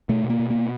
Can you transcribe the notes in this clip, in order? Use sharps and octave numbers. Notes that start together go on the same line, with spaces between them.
B2 A3
B2
A#3
B2
A#3
B2